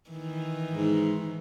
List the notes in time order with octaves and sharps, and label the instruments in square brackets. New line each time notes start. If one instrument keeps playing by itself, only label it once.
[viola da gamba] D#3 E3
[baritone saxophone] G#2